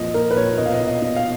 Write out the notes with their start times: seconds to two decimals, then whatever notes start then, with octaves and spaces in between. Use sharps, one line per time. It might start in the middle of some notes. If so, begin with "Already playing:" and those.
Already playing: F2 A#2 F3 D#5
0.14 A#2 A#4
0.31 B4
0.36 A#1 C#5
0.58 B2 D#5
0.66 F5
0.74 D#5
0.80 B2
0.88 D#5
1.02 B2
1.16 F5